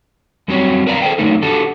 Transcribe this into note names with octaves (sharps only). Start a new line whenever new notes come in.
F#2 G3 C4 F#4 G4 C#5
A#4 B4 D5 F5 A#5
G#4 A4 C5 G5
F#2 D3 F#3 A3 D#4 A#4
D4 F#4 G4 A4